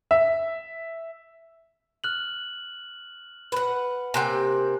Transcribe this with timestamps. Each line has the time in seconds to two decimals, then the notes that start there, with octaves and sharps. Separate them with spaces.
0.11 E5
2.04 F6 F#6 F#7
3.52 B4 F#5
4.14 C3 A#3 G5 G#5 A#5 F#6